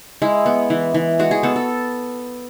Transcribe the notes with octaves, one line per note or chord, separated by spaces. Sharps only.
G#3 E4
B3
E3
E3
G#3 F#4
G#4
B3 A4
A4